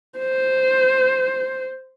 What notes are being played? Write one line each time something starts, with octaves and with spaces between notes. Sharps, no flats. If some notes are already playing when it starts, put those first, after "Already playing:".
C5